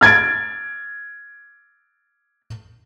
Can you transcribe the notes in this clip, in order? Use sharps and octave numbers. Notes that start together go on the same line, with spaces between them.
F6 G#6 A6 D7